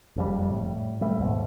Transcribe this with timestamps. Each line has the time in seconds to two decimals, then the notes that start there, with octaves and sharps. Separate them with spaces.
0.16 F#1 F2 G3
0.50 A2
1.01 G3 A3
1.19 D#2 G#2 B2